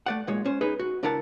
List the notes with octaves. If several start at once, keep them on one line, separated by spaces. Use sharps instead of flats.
A3 D5 F#5
B1 A#2 G#3 C#5
C#4 C5
D#4 G#4 B4
F#4
C#2 D4 E4 A#4 F#5 A5